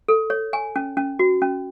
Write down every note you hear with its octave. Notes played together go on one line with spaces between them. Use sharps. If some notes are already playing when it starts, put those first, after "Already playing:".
A4
C#5
G#5
C#4
C#4
F#4
C#4